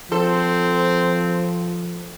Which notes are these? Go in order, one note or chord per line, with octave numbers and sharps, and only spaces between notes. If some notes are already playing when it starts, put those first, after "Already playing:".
F3 C4 A4 C5